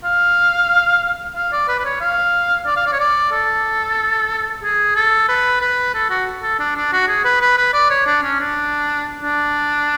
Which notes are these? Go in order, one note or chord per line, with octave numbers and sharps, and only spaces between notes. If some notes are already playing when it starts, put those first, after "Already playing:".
F5
F5
D5
B4
B4
C#5
F5
D5
F5
D5
C#5
D5
A4
G#4
A4
B4
B4
A4
F#4
A4
D4
D4
F#4
G#4
B4
B4
B4
D5
C#5
D4
C#4
D4
D4